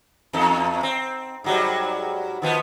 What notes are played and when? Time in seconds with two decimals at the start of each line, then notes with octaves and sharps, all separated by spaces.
0.33 E2 D#4 A4
0.83 C4
1.44 G#2 F#3 G3
2.42 D#3 F3 B3